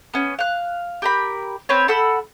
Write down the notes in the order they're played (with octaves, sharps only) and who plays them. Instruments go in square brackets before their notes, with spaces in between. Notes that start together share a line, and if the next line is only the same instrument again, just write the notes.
[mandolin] B3 C#4
F5 F#6
G4 A#4 B5
C4 B4 C#5
A4 F#5 B5 E6